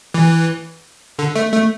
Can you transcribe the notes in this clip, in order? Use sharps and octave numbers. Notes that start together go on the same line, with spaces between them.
E3
D3
A3
A3